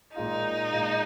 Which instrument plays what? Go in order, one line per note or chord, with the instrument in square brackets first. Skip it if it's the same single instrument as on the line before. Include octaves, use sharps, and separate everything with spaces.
[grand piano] A#2 G#3 F4 [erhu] D#4
[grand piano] A#2 G#3 F4